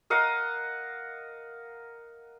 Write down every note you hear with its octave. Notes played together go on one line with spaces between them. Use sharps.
A#4 D#5 F5 F#5